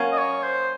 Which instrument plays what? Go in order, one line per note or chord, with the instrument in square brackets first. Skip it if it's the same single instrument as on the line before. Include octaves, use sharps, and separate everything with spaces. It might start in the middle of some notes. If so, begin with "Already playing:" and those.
Already playing: [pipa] F#3 A#3 C#4
[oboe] D#5
C#5
C5